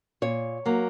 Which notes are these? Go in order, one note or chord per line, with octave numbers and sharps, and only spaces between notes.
A#2 C#5
F#3 A#3